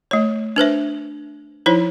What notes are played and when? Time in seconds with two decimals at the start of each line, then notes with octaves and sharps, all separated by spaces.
0.11 A3 C#5
0.56 D4 B4 C5 E5
1.66 F3 D#4 E4 C5 C#5